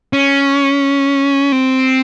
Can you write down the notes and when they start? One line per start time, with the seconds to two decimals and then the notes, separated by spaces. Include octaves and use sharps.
0.13 C#4
1.52 C4